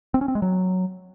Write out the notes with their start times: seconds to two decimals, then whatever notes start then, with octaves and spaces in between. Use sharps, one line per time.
0.14 C4
0.21 C#4
0.28 C4
0.35 G#3
0.42 F#3